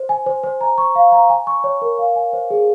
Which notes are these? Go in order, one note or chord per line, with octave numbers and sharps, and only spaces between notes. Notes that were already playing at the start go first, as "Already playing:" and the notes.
Already playing: C5
G#5
C5
C5
A#5
C#6
F5
A#5
G#5
C#6
C#5
A#4
F5
G#5
C5
G#4